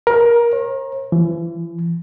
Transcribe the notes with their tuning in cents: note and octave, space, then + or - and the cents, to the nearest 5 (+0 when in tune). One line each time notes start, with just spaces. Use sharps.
A#4 +20
C#5 -45
E3 +40